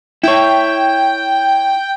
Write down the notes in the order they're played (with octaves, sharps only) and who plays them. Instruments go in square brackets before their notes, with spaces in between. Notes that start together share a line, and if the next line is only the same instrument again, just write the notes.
[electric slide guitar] E4 C#5 [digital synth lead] G5